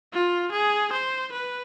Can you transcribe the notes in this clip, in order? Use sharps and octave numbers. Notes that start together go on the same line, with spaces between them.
F4
G#4
C5
B4